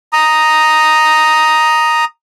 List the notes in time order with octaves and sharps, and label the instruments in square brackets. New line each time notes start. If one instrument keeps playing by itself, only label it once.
[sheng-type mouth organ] A#5 D#6